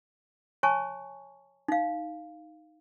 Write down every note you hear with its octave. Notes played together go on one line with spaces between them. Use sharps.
C#5 G#5 A5 C#6
D#4 F5